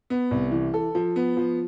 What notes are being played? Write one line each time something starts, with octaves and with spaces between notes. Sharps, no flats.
B3
C2
E3
A4
F3
B3
F3